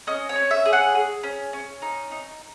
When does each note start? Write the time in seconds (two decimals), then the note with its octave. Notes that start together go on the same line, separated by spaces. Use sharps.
0.07 C#4 D#5
0.29 C#5
0.36 C#4
0.51 E5
0.66 G#4
0.73 F#5
0.95 G#4
1.23 C#4
1.53 C#4
1.82 D#4
2.11 D#4